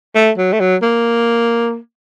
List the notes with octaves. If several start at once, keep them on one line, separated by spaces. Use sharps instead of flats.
A3
F#3
A3
F#3
A#3